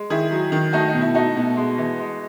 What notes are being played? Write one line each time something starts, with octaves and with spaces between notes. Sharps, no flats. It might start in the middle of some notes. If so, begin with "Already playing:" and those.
Already playing: G#3
D#3 E4 G#4
F#3
D#3
A3 D#4 F#4
D#4
B2
E4
A3 D#4 F#4
B2
G#3
E3
G#3